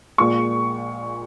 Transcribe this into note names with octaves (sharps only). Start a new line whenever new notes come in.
A#1 A#2 G#3 C#6